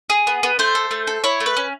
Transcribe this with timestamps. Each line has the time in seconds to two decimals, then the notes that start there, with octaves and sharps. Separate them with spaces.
0.10 G#4
0.27 B3
0.43 B3
0.59 A3 C5
0.75 A4
0.91 A3
1.07 A4
1.24 E4 C#5
1.40 A3
1.46 B4
1.57 C#4